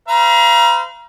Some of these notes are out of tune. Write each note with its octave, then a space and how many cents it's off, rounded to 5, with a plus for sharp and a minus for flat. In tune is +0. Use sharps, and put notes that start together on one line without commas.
C5 -45 F5 -35 A#5 +30